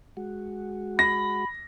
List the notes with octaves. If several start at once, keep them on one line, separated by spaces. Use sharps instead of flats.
G#3 F#4
B5 A#6